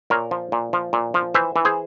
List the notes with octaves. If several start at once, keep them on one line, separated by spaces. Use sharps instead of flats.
A#2 A#4 C#5
F3
A#2
F3
A#2
F3
E3 C5 E5
E3
G#4 C5